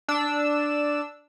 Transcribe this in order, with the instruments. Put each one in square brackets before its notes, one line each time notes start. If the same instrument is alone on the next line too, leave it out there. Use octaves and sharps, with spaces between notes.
[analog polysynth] D4 E6